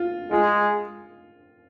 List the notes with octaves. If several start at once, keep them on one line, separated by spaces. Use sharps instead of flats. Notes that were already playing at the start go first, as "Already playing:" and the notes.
Already playing: F4
G#3 F4